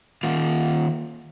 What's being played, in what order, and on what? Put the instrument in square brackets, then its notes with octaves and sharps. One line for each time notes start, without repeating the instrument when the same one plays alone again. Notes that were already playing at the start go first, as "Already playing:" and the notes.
[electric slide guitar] D#3 A#3 F4